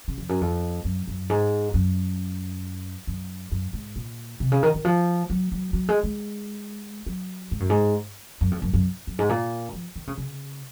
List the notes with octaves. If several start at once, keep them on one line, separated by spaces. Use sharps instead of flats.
C#3
F2
F#2
F2
F#2
F#2
G#2
F#2
F#2
F#2
G#2
A#2
C3
C#3
D#3
D#3
F3
F#3
F#3
F#3
G#3
G#3
F#3
G#2
F#2
G#2
F#2
F2
F#2
F#2
F#2
G#2
A#2
F3
D#3
C#3
C#3